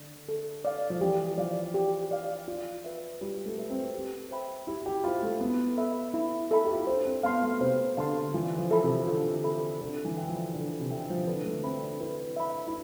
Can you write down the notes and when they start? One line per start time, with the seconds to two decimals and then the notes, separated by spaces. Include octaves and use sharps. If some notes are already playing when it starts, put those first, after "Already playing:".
Already playing: D3
0.29 A4
0.65 D5 F5
0.90 F3
1.01 E3 G4
1.38 F3 D5 F5
1.74 G4
2.11 D5 F5
2.48 F4
2.84 B4 E5
3.21 G3 F4
3.46 A3
3.58 B4 E5
3.70 C4
3.94 G4
4.31 C5 E5 G5 B5
4.67 E4 G4
4.86 G4
5.04 F4 C5 E5 G5 B5
5.23 A3
5.41 B3 E4
5.77 A4 E5 B5
6.14 E4
6.51 A4 E5 B5
6.65 G4
6.72 F4
6.80 E4
6.87 D4 C5
7.05 C4
7.23 B3 F5 A5 C6
7.42 A3
7.61 C3 C5
7.97 D3 F5 A5 C6
8.34 E3 F4
8.58 F3
8.71 A4 E5 B5
8.83 C3
9.07 D3 F4
9.44 A4 E5 B5
9.81 D3 A4
10.05 E3
10.17 E5 G5
10.29 F3
10.54 D3 A4
10.80 C3
10.90 D3 E5 G5
11.10 F3
11.19 E3
11.27 D3 B4
11.45 A3
11.64 C4 E5 B5
11.82 D4
12.00 E4 B4
12.36 E5 B5
12.68 E4